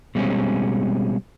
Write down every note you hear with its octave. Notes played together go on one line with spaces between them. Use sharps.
B2 G3 G#3 C4 C#4